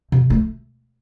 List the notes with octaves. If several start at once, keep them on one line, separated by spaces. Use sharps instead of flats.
C3
A3